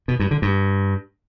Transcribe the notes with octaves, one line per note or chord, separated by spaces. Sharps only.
B2
G2
D3
G2